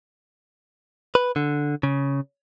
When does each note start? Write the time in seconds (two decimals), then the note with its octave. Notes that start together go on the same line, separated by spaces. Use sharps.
1.15 B4
1.36 D3
1.83 C#3